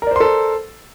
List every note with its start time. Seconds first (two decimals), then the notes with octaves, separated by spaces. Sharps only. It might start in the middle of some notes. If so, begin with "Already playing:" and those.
0.02 A#4
0.07 D5
0.11 C5
0.16 C6
0.20 A4